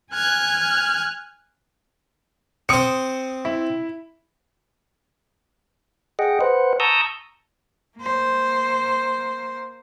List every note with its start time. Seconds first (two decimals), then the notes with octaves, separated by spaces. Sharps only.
0.12 G#5 F6 F#6 G#6
2.69 C4 C5 D#6 C#7
3.45 E4
6.19 G#4 D#5 F#5 G5
6.41 B4 C5 F#5
6.80 A5 A#5 C#6 D#6 E6 G6
7.97 A#3 C5